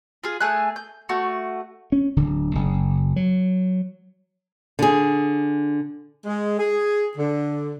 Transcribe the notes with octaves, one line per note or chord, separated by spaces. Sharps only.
F4 G#4
A3 G#4 G#5 F#6
G6
A3 F#4
C#4
D1 D3
F#1
F#3
D3 G#4
G#3
G#4
D3